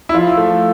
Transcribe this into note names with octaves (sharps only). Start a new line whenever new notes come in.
E4
F3 F4
A3